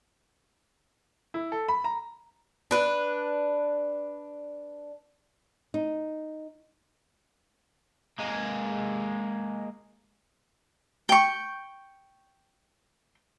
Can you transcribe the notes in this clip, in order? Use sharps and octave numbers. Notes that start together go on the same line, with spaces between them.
E4
A4
B5
A#5
D4 B4
D#4
G#3 A#3
G5 C#6